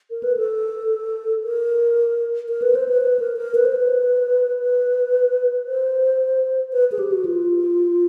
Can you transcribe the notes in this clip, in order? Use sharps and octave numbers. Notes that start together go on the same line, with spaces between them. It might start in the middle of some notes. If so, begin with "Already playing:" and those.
A#4
B4
A4
A#4
A#4
B4
C5
B4
B4
A#4
A#4
B4
C5
B4
B4
C5
B4
G#4
G4
F#4
F4